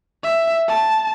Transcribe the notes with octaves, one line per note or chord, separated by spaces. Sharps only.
E5
A5